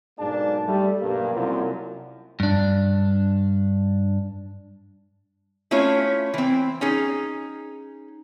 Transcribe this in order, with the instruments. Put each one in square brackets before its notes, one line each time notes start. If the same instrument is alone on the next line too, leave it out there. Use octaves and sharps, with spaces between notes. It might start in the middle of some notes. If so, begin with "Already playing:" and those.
[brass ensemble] B1 G#2 A#3 D4 G#4 A5
G3 A3
B1 G2 A#3
C2 F#2 F3
[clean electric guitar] G2 D4
[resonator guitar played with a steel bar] A3 C#4 E4 F4 C#5
E3 C4
C#4 D#4 G#4